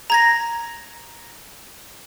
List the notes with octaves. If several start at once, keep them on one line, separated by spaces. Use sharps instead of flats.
A#5 G#6 A#6